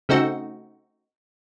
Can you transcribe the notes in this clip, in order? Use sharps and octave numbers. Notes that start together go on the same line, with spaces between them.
C#3 A3 C4 D#4 F#4